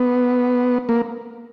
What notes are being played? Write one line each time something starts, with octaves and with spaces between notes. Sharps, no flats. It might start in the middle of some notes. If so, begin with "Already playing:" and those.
Already playing: B3
A#3